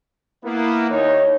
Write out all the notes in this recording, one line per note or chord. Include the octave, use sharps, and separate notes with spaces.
A#3 B3 E4
D#2 D#4 C#5